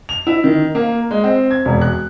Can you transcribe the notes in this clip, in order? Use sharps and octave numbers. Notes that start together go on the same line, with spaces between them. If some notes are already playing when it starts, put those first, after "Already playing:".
F7
E4
D#3
A#3
G#3
C4
G#6
E1
F#6